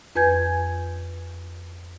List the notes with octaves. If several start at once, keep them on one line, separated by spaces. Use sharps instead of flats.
F2 B4 G#5 G6 G#6